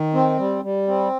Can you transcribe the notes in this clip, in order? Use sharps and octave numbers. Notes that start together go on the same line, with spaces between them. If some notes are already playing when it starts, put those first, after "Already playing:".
Already playing: D#3
C4
G3
G3
C4